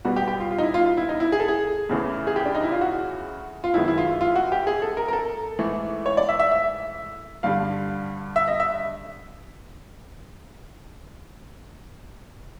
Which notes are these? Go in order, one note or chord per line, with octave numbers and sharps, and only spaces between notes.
B2 G3 B3 F#4
G4
G4
F4
F4
D#4
E4
F4
F4
E4
D#4
E4
G#4
A4
G#4
E2 C#3 E3 A3
G#4
G4
D4
D#4
E4
F4
F#4
F4
F#2 D#3 G#3 B3 E4
E4
F4
F4
F#4
G4
G#4
A4
A#4
A#4
A4
G#2 E3 A3
C#5
D5
E5
E5
E5
G2 D3 G3 F5
E5
D#5
E5